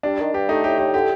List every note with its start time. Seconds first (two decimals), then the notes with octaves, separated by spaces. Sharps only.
0.03 G3 D4
0.19 D#3
0.33 G2 G4
0.48 A3 D#4
0.64 A2 G4
0.79 A2 G4
0.94 D3 G4